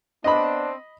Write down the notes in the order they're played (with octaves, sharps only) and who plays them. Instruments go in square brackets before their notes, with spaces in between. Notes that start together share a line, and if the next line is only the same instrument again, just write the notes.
[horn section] B3 C4 D4 [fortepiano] D#5 B5